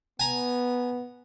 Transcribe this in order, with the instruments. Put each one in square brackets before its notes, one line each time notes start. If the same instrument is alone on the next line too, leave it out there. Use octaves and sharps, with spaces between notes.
[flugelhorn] B3 [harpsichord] G#5 A#5